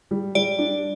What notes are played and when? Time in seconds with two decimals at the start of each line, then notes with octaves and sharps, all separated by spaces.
0.11 G3
0.35 G3 D5
0.59 D4